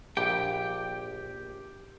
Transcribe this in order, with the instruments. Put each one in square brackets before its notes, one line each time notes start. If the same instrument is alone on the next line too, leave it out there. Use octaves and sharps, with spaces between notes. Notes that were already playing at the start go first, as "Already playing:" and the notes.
[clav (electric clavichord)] A#1 [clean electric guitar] G4 G5